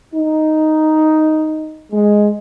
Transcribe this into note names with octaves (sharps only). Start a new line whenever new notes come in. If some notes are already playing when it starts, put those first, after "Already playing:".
D#4
G#3